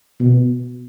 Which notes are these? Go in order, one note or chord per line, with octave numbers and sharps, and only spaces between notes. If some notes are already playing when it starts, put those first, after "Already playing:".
B2